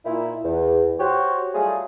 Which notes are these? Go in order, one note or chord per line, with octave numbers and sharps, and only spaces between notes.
A#2 D#4 E4
E2
F#4 G4 C5 C#5
F#3 G3 A3 F4 G#4